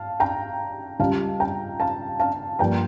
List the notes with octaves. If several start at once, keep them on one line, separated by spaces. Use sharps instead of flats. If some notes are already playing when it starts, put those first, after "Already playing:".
Already playing: F5 A5
G5 A#5
C#2 C#3 G3 F5 A5
G5 A#5
F5 A5
F5 A5
G2 F3 A#3 G5 A#5